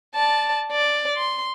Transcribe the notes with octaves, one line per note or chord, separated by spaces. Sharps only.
D5 A5
D5
C6